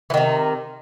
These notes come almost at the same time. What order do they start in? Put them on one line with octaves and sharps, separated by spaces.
E3 D#3 C3